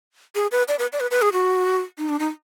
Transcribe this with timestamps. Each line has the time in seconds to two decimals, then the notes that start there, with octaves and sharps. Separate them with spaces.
0.36 G#4
0.52 B4
0.68 D5
0.79 B4
0.93 D5
1.00 B4
1.11 B4
1.22 G#4
1.33 F#4
1.98 D#4
2.09 D4
2.19 D#4